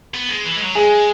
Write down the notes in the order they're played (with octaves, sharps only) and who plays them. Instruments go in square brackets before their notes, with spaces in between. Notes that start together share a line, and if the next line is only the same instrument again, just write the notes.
[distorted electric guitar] B3
G#3
E3
G#3
F#3
[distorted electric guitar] G#3 [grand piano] G#4